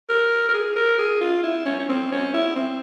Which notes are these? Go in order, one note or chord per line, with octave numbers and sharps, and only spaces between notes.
A#4
A#4
G#4
A#4
G#4
F4
E4
C#4
C#4
C4
C#4
E4
C4